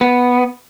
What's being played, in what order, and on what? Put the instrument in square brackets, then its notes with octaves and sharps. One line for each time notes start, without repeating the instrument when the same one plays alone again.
[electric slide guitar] B3